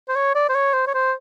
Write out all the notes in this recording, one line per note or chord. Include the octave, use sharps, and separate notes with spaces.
C5
C#5
D5
C5
C#5
C5
C#5
C5